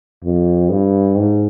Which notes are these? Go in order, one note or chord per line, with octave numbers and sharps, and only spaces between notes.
F2
G2
G#2